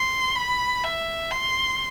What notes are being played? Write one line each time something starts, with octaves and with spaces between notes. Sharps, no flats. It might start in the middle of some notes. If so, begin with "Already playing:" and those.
Already playing: C6
B5
E5
C6